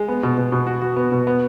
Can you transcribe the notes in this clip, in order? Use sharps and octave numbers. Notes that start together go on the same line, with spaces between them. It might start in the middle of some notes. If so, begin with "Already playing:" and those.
Already playing: G#3
B3
B2
B2
B2
F#4
F#4
B3
B2
B3